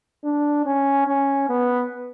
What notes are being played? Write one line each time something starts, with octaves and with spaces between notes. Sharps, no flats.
D4
C#4
C#4
B3